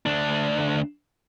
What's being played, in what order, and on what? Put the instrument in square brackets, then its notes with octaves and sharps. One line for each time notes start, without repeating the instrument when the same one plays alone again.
[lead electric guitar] D2 D4